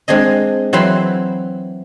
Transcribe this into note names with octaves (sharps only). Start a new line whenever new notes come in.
G#3 C4 D4 G#4 D#5
E3 F#3 C4 C5 B5 C6